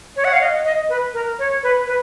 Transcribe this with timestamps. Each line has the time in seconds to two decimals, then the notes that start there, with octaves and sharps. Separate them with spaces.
0.16 C#5
0.25 F#5
0.33 F5
0.41 D#5
0.65 D#5
0.89 B4
1.13 A#4
1.39 C#5
1.63 B4
1.87 B4